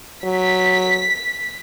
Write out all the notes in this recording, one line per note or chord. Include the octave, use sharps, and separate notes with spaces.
F#3 B6